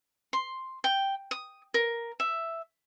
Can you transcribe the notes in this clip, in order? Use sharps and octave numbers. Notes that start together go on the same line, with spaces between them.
C6
G5
D#6
A#4
E5